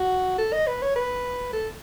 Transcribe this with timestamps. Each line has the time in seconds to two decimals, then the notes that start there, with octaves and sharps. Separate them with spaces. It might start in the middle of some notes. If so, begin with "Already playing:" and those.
Already playing: F#4
0.38 A4
0.53 D#5
0.67 B4
0.82 C#5
0.96 B4
1.53 A4